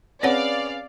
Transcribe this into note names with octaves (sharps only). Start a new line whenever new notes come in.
C4 C#4 G#4 B4 C#5 D5 F5 F#5